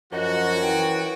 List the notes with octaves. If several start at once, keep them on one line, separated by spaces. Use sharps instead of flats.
F#2 F3 F#4 D#5
E3 G5